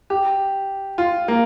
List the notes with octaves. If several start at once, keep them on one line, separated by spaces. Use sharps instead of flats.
G4
F4
A#3